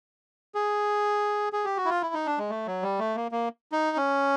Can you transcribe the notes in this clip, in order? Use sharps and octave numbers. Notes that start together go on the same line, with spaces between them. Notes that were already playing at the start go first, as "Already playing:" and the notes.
G#4
G#4
G4
F#4
E4
F4
E4
D#4
D4
G#3
A3
F#3
G3
A3
A#3
A#3
D#4
C#4